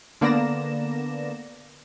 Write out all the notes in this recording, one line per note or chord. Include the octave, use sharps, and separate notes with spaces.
D3 A#3 B3 D5 A#6 E7